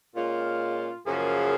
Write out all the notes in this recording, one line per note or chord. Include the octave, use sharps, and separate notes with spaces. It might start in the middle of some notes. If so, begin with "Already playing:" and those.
A#2 G#3 C#4 F4
F#2 C#3 F3 A#3 C#4 G#4